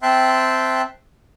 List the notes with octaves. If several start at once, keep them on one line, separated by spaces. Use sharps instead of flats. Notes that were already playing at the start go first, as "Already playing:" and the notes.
C4 E5 G5 A5 C6 F#6